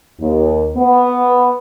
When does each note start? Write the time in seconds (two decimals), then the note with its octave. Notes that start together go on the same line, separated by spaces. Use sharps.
0.20 D#2
0.77 B3